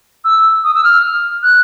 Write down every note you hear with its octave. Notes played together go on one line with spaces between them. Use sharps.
E6
D#6
E6
F6
F#6